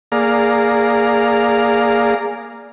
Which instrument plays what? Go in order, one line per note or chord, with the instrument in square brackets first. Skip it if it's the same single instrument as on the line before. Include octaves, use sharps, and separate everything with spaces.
[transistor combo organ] A#3 G#4 D5 F5 A#5